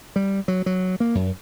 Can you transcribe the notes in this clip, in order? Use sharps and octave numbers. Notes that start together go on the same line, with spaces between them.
G3
F#3
F#3
A#3
F#2